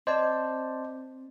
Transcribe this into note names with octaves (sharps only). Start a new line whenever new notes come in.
C4 C5 D5 D#5 A5